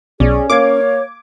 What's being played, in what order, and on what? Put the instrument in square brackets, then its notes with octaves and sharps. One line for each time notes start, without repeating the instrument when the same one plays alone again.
[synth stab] B1 [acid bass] C#4 [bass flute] G#4 [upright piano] D5
[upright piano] A#3 F5 G#6 [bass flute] C#5 [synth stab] D6